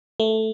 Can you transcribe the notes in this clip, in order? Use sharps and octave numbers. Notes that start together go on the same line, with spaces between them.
A3